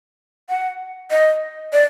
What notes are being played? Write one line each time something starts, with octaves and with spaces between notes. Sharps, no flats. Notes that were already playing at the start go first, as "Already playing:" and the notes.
F#5
D#5
D5